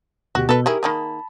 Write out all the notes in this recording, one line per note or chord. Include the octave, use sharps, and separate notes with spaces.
D2 B2 F#4 G4
B2 A4 B4
D#3 E4 G4 G#4 A#4
D#3 A#3 G#4 A5 B5